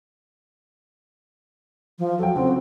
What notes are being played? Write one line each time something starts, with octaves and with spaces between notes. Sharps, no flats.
F3
F#3 A4 G5
C#3 C4 F#4